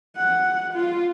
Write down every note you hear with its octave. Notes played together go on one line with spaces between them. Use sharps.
F#5
F4